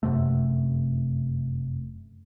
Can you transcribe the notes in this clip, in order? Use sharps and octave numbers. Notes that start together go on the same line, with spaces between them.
F1 F#2 C3 A3